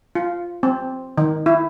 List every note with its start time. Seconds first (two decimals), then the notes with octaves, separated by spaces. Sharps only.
0.15 F4
0.63 C4
1.18 D#3
1.46 E4